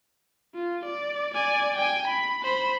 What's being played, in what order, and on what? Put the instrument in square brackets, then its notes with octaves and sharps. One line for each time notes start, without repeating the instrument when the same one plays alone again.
[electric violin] F4
D5
D5 G#5
G5 G#5
B5
C5 B5